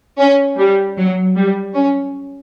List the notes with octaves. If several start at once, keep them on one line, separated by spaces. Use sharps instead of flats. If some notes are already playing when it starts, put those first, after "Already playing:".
C#4
G3
F#3
G3
C#4